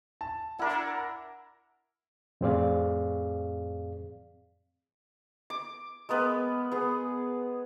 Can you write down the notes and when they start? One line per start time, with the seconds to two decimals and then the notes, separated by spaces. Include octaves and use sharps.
0.21 A5
0.59 D4 E4 A#4 F#5
2.41 F2 A2 C4 G#4 D5 F5
5.50 D6
6.09 G#3 A#3 B3 B4
6.72 B3 G#4